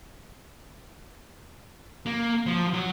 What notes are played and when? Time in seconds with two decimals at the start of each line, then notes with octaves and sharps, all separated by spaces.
2.06 A#3
2.46 F3
2.73 F#3